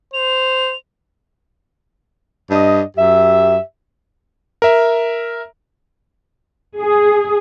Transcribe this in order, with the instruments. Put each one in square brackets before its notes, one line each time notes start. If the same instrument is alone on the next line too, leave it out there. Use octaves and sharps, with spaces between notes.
[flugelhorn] C5 [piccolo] F7
[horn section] G2 D4 D#5
F#2 G4 E5
[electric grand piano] A#4 E5
[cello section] G#4